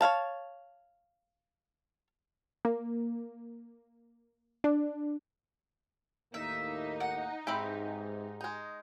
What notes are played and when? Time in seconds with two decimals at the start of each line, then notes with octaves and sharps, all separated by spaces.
0.01 C#5 D5 F5 A5
2.65 A#3
4.64 D4
6.34 D#2 A2 A#3 D#4 E5
7.00 F#5
7.47 G#2 E3 C4 G4 B5
8.41 G#3 D#4